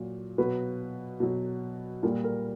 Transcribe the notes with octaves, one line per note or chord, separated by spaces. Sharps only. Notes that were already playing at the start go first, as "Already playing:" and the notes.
Already playing: A#2 F#3
B2 F#3 B4
B2 F#3
A#2 G3 A#4
A#4